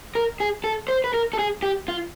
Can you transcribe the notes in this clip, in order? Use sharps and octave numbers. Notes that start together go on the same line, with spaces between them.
A#4
G#4
A4
C5
B4
A#4
A4
G#4
G4
F4